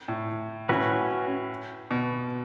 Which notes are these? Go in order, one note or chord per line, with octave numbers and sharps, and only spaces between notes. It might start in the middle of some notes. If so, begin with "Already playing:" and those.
A2
A2 C#4 F#4 B4
B2